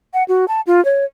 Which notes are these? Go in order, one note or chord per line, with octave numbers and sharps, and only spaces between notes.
F#5
F#4
A5
F4
C#5